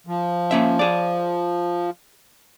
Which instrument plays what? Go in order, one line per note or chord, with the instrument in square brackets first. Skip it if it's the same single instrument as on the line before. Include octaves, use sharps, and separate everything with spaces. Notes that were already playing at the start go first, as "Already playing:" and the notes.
[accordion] F3
[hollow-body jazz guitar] A#3 C#4 E5
G#4 D5